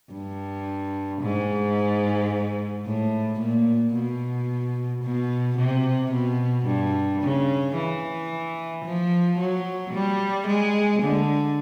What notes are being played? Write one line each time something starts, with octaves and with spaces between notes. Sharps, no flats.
G2
G#2
A2
A#2
B2
B2
C3
B2
G2
C#3
E3
F3
F#3
G3
G#3
D3